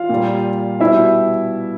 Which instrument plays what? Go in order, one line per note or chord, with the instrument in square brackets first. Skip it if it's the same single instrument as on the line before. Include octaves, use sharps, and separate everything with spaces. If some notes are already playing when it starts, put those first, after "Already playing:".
Already playing: [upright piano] F4 F5
A#2 G3
B2 G3 E4 E5